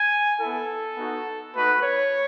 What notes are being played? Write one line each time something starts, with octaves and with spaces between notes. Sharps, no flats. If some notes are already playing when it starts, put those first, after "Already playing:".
Already playing: G#5
B3 E4 A4
B3 D#4 F#4
A3 D#4 F#4 B4
C#5